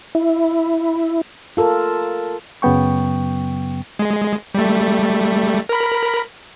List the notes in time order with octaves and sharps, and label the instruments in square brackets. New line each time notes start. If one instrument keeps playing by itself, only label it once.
[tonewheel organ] E4
[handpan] F4 A4 A#4
[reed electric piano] F#2 C#3 F#3 B3 G5 C#6
[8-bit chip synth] G#3
G3 A3
A#4 B5